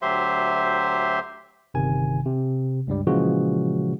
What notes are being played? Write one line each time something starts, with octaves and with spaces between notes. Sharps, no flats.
D2 F#3 G4 C5 E5 C6
G1 C3 D#3 G#5
C3
C#2 G2 G3
A#2 C#3 E3 F3 G#3 F#4